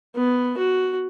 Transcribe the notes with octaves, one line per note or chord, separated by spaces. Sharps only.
B3
F#4